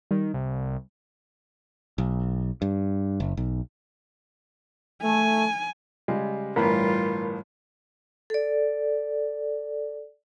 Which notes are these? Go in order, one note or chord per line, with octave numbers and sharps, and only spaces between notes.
D#3 G3
C2
B1
G2
F#1
B1
A3 G#5
C#3 G3 G#3
G1 A2 E3 G3 F4 A#4 B5
A4 D5